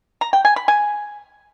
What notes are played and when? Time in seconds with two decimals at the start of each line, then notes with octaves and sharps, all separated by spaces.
0.21 A#5
0.33 G5
0.45 G#5
0.56 B5
0.68 G#5